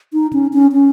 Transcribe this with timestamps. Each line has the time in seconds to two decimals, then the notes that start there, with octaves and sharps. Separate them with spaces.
0.13 D#4
0.33 C#4
0.53 C#4
0.73 C#4